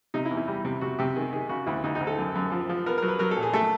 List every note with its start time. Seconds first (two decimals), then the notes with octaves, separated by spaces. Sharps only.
0.14 C3 D#4
0.26 E4
0.31 E2
0.37 E4
0.48 G3
0.65 C3
0.81 C3 F#4
0.99 C3 G4
1.15 D#3 G#4
1.33 D#3 G#4
1.49 C#3 F#4
1.66 D2 E4
1.84 D2 D#4
1.95 D#4
2.01 D2
2.07 A4
2.18 F#2
2.35 F#2
2.52 F3
2.69 F3
2.86 B3 A#4
2.98 A#4
3.02 F#3
3.08 B4
3.19 F#3 A#4
3.31 A4
3.37 A#2
3.42 G#4
3.53 A3 A4